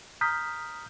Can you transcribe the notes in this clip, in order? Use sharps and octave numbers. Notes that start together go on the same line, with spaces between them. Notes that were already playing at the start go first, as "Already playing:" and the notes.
A#5 D#6 F6 G6 B6